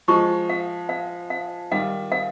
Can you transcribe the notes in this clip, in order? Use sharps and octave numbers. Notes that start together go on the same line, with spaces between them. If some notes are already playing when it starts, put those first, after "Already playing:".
F3 G#3 C#6
F5
F5
F5
D#3 G3 F5
F5